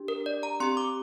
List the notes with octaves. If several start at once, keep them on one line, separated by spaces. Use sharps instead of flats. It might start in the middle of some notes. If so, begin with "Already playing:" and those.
Already playing: D4 G4
A#4
D5
A#5
C4 G4 C6
D6